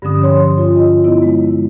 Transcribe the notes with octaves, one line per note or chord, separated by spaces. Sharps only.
G2 D3 F3 C#4 D#6
C#5 C6
G2 F4
D#5
B3 E4 D#5
G#3